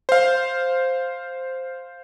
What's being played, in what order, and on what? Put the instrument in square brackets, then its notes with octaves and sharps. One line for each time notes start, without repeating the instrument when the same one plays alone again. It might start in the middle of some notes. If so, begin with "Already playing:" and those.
[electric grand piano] C5 F5